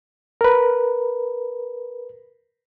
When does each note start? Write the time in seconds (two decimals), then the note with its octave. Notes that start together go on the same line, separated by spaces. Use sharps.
0.41 A#4 B4